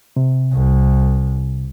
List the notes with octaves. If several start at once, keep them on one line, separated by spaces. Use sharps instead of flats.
C3
C2